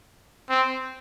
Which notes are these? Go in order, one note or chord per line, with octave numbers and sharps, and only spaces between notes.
C4